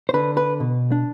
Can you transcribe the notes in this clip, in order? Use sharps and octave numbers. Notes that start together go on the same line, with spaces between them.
C5
D3 B4
B4
B2
D4